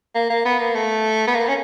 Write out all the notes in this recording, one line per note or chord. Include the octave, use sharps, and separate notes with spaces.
A#3
A#3
B3
A#3
A3
B3
A#3
C#4